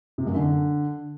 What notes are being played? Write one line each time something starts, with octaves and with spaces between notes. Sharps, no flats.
C3
F#2
D3